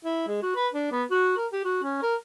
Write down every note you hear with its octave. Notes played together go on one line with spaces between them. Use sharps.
E4
G#3
F#4
B4
D4
B3
F#4
A#4
G4
F#4
C#4
A#4